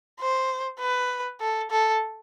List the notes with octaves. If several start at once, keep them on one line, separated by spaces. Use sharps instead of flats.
C5
B4
A4
A4